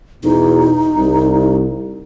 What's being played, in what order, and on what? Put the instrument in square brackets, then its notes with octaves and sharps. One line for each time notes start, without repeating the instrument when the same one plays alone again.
[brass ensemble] E2 B2 [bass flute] D#4
[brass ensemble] C2